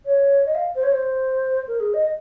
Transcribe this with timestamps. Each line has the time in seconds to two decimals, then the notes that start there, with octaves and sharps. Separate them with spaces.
0.05 C#5
0.46 D#5
0.55 F5
0.75 C5
0.83 C#5
0.92 C5
1.67 A#4
1.80 G#4
1.94 D#5